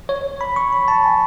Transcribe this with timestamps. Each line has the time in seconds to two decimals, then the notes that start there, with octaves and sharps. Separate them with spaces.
0.09 C#5
0.41 B5
0.56 C#6
0.72 B5
0.88 A5
1.04 G#5